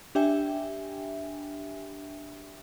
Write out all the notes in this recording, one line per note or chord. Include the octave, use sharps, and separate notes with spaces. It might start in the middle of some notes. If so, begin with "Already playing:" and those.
D4 G4 E5 G5 G#5